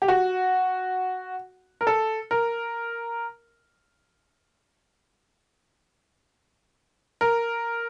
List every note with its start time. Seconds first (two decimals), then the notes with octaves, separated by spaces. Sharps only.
0.02 G4
0.08 F#4
1.81 A#4
1.87 A4
2.31 A#4
7.21 A#4